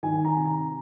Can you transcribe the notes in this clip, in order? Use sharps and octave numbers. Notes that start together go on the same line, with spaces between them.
D#3 G#5
A#5
C3
A#5